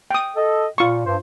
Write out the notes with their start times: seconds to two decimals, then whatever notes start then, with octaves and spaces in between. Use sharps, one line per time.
0.11 G5 D#6
0.36 A4 D#5
0.78 A#2 F4 C#6
1.05 G2 C5